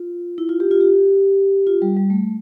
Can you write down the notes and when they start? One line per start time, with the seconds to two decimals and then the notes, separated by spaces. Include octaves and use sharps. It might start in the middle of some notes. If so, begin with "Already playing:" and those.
Already playing: F4
0.38 E4
0.49 F4
0.60 G4
0.71 F4
0.81 G4
1.67 F4
1.82 G3
1.97 G3
2.10 A3